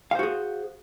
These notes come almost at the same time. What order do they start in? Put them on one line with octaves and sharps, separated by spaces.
F5 C5 F#4 G#4